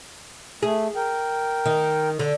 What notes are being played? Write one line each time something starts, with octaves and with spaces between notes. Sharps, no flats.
A3 G#4
A#4 G5
D#3
D3